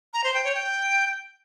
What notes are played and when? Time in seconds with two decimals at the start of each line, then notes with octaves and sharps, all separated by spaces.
0.13 A#5
0.24 C5
0.34 G5
0.44 C#5
0.55 G5